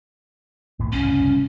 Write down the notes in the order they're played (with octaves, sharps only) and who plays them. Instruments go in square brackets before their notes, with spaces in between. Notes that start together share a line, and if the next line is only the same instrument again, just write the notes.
[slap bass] G#1 A2 B3
[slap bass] F#1 C2 [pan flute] C#4